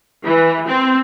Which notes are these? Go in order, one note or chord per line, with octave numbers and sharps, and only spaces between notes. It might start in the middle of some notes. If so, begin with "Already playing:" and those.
E3
C4